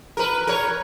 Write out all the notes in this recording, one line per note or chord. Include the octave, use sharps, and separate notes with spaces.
A#4 B4
A#4 C#5